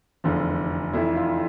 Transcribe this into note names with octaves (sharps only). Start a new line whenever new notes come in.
F1 E2 D3 F3
F1 F2 E3 E4
F4